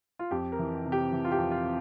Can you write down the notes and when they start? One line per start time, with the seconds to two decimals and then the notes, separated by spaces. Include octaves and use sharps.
0.19 F4
0.31 F2 G4
0.52 A#4
0.59 E3
0.86 C3
0.92 G4
1.12 E3
1.25 F4
1.32 G4
1.38 F2
1.51 F4